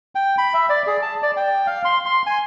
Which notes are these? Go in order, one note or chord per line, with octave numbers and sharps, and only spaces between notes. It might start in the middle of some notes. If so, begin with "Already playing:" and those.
G5
B5
E5
D5
G#4
A5
D5
G5
F5
C6
C6
G#5